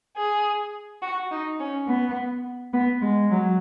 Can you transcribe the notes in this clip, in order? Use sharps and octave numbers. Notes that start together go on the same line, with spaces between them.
G#4
F#4
D#4
C#4
B3
B3
G#3
F#3